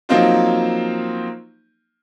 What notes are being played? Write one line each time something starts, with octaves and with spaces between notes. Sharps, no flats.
F3 F#3 A#3 C4 D#4 F4